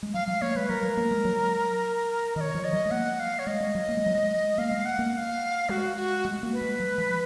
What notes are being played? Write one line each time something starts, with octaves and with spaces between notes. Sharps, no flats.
G#3
F#3 F5
F#3 F5
A#3 C#5
G#3 B4
F#3 A#4
F#3
A#3
G#3
F#3
D#3 C#5 D#5
F3
D#5
F#3
G#3
A#3 F#5
F5
C#5
G#3 D#5
G#3
F#3
A#3
G#3
F#3
G#3
A#3 F5
G#3
F#5
A#3
F#5
F5
G#3 F#4
F#4
G#3
A#3
B4
G#3
F#3
F3